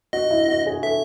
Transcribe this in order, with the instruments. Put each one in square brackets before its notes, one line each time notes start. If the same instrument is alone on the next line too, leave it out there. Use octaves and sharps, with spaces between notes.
[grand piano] F#4 [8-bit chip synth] D#5
[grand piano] E4
F#4
G#4
[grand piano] A4 [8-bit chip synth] E5